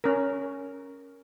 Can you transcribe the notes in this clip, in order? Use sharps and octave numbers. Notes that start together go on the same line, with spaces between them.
C#4 A#4